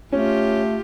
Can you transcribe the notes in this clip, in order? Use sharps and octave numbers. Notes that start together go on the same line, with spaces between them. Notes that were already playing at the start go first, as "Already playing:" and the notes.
A3 C#4 F4 G4